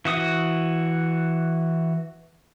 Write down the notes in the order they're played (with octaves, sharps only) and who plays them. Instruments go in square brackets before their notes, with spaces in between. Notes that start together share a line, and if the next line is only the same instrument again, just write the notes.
[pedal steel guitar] E3 F#4 D#6